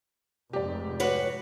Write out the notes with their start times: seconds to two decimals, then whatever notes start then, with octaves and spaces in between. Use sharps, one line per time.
0.53 F1 G#2 G4 D5
1.00 F#4 B4 C#5